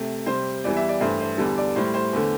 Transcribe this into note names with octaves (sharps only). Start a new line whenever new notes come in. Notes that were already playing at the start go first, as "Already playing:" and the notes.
Already playing: C3 A3
C3 G3 C5
E2 E3 G3 D5
E5
D5
G2 E3 A3 C5
C5
E2 D3 G3 A4
D5
A2 G3 C5
C5
E2 D3 A3